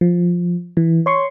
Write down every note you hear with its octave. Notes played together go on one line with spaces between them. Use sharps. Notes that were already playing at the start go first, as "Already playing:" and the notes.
F3
E3
C#5 C6 C#6